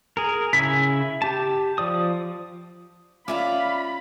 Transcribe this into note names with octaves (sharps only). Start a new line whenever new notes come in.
G#4 A#4
C#3 E4 G#5 B6
G4 A5
F3 D5 D#6
C#4 F4 D5 E5 F5 A#5 B5 D6